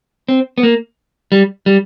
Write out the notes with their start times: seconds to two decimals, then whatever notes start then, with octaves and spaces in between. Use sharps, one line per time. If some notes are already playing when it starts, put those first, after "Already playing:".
0.29 C4
0.58 B3
0.63 A#3
1.32 G3
1.66 G3